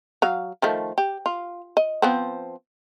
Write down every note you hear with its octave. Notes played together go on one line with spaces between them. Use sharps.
F#3 F5
D#3 F3 A3
G4
F4
D#5
F3 B3 C4